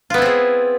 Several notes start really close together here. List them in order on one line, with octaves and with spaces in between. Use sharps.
F4 B3 E4 C4 G#4